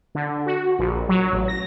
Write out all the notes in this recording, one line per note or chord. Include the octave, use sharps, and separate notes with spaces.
D3
F#4
A#1
F#3
A1
A#6